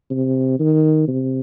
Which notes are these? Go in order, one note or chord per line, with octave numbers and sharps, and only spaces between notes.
C3
D#3
C3